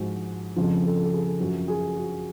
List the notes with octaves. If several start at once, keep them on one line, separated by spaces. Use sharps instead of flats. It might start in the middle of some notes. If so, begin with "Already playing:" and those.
Already playing: G#2 F3 F#4
F2 C#3 F3
A4
A4
G#4
F#2 F3 F#4
G#4
F#4